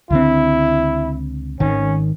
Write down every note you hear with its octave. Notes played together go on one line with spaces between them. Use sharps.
C#2 D3 C4 E4
G#1 D#3 C#4